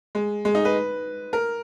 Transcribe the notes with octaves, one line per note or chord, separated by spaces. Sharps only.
G#3
G#3
D#4
B4
A#4